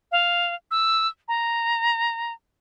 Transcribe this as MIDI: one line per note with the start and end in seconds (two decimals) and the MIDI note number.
0.12 0.55 77
0.71 1.08 88
1.28 2.33 82